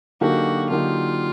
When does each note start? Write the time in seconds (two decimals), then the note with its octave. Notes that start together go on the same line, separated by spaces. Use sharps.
0.21 D3 F#3 A#3 D#4 F#4 G4
0.70 D3 F#3 A#3 D#4 F4 G4